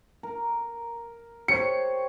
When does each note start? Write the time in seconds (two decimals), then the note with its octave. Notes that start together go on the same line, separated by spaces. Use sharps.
0.23 A#4
1.48 G4 C5 C#5 C#7